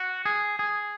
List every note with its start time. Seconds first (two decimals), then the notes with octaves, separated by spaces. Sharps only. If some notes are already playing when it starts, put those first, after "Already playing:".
Already playing: F#4
0.25 G#4
0.59 G#4